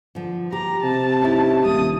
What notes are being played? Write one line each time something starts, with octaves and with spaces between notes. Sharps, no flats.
D3 F3
G4 A#5
C3 A5
C#4 D#4 E4
D#1 A#3 D#6